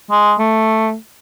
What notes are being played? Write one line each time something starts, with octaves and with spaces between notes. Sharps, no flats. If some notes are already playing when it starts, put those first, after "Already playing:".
G#3
A3